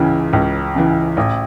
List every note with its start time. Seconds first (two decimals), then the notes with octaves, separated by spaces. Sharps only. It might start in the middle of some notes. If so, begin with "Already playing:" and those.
Already playing: C#2 C#3 E3
0.33 C#2
0.75 C#3 E3
1.17 A1